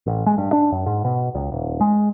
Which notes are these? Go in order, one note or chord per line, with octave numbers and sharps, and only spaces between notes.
A1
G#3
G2
D4
F#2
G#2
B2
C#2
D#1
G#3